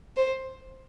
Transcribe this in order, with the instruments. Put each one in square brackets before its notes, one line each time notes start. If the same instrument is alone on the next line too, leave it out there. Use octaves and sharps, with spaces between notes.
[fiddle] C5